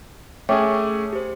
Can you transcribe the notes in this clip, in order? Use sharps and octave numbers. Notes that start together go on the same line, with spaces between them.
A3 C#4 G#4 C#5 E5 G5 C#6 D6
G4 C5